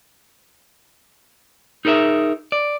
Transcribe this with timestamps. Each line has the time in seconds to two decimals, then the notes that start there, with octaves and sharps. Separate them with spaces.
1.85 D#4 G#4 A#4 D#5 E5
2.52 D5